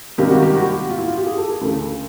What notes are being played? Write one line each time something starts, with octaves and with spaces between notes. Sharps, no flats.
C#2 C3 D#3 G3 A#3 G4
F#4
G4
F#4
F4
E4
F4
G4
G#4
A4
A#4
D2 C#3 E3 A3